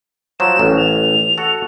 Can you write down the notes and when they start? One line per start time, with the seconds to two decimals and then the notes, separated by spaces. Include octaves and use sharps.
0.40 F3 F#3 E7
0.59 A1
0.77 F7
1.38 F#4 A4